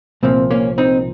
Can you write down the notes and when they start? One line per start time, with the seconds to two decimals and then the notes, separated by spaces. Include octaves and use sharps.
0.23 C2 A#2 F3 C4
0.51 A#3 C#4
0.78 C4 D#4